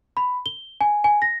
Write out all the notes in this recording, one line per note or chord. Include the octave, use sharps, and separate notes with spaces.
B5
G7
G#5
G#5
A#6